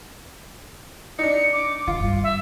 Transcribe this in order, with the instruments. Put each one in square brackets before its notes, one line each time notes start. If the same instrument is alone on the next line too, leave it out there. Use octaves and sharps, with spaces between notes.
[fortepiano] D4 D#4 [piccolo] C#7
[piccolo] D6
[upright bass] D#3 [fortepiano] F4
[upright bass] G2
[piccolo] E5